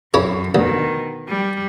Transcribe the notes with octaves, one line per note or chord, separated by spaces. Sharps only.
F#2 C#4 E4 G#4
D2 B2 D#3
G3